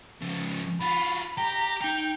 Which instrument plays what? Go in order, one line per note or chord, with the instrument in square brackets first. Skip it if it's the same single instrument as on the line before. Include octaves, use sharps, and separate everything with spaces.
[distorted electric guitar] C#3 F3
[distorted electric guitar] F4 F#4 [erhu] B5
[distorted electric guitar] G4 [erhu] A#5
[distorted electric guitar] D#4 A#5 [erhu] G5